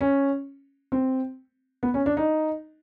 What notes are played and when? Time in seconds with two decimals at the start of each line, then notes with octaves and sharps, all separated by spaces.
0.01 C#4
0.92 C4
1.83 B3
1.94 C#4
2.06 D4
2.17 D#4